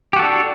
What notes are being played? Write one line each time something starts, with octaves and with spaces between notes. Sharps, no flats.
D4 F#4 G4 A4